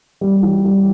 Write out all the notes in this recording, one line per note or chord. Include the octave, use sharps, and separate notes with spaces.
G3
E3
G3